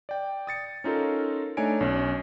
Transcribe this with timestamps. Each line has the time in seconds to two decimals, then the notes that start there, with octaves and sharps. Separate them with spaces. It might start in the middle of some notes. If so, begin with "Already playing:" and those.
0.09 D5 G5
0.47 D#6 A6 C#7
0.84 C#4 D#4 F4 A4 A#4
1.57 A3 D4 D#4 C#5 G#5 D7
1.81 B1 C#4